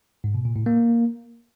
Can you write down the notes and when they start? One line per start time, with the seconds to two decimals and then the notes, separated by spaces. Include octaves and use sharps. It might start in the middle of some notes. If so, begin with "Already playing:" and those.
0.24 G#2
0.35 B2
0.45 A#2
0.56 A2
0.66 A#3